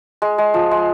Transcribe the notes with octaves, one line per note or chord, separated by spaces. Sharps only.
G#3
G#3
F3
G#3